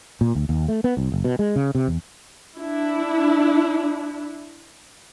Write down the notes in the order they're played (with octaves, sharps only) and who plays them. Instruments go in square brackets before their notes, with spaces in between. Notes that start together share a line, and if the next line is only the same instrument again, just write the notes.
[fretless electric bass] A#2
D2
D#2
A3
B3
C2
F#1
B2
G#3
C#3
C3
E2
[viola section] D4 E4